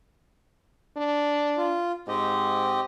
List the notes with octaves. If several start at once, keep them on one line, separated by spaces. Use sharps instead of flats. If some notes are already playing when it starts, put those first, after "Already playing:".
D4
F4
G#2 C4 G4 D#5